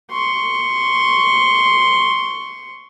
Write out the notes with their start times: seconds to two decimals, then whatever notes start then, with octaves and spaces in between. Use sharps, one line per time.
0.11 C6 C#6